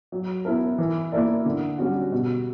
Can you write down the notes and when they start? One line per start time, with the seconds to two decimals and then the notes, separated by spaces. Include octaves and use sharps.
0.12 F#3
0.45 B3 E4 A#4
0.78 E3
1.12 A#3 E4 A#4 D5
1.46 D3
1.78 G3 C#4 F#4
2.12 B2